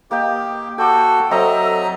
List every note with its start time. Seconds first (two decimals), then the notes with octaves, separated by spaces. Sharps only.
0.11 A#3 G4 D#5 G5
0.78 F#4 A4 G5 D6
1.31 F#3 C4 A4 D#5 E5 A#5